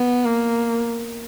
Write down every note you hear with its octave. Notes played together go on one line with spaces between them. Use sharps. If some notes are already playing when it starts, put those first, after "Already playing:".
Already playing: B3
A#3